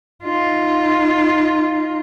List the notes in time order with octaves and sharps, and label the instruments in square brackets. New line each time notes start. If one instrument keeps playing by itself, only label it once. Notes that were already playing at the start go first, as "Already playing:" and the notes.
[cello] D#4 F4